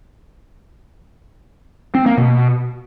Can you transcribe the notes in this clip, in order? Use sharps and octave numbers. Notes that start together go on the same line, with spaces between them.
C4
A#3
B2